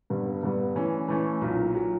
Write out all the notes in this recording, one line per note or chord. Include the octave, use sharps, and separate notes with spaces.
G2 D3 G3 B3
G2 D3 G3 B3
E3 A3 C#4
E3 A3 C#4
B1 A#2 F#3
A#2 F#3